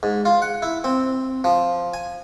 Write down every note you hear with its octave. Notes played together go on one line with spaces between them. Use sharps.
G#2
F4
F#5
E4
C4
F3
G#5